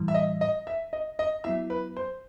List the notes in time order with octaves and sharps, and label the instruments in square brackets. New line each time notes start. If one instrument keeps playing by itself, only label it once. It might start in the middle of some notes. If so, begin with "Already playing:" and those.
Already playing: [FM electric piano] A2 E3 G3
[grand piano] E5
D#5
D#5
E5
D#5
D#5
[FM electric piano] F#3 B3 E4 [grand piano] E5
[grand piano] B4
C5